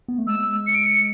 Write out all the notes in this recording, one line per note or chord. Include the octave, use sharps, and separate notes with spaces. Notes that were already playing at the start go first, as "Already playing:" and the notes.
B3
A3
G#3 E6
C#7
D7
C#7